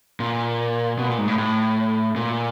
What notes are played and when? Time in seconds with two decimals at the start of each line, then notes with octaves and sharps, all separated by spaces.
0.20 A#2
0.98 B2
1.09 A#2
1.18 G#2
1.27 A2
1.38 A2
2.16 A#2